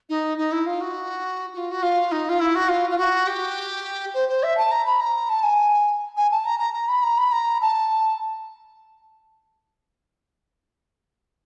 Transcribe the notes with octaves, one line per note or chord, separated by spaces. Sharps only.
D#4
D#4
E4
F4
F#4
F#4
F4
F#4
F4
D#4
F4
E4
F#4
F4
F4
F#4
G4
C5
C5
E5
A5
A#5
B5
A#5
A5
G#5
G#5
A5
A#5
A#5
A#5
B5
A#5
B5
A#5
A5